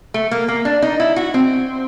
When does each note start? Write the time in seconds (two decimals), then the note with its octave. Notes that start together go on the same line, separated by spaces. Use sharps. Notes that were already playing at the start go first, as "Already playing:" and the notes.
0.14 A3
0.31 A#3
0.48 A#3
0.65 D4
0.82 D#4
1.00 E4
1.16 F#4
1.34 C4